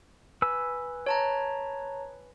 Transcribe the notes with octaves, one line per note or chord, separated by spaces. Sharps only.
B4 G#5 E6
C#5 A5 A#5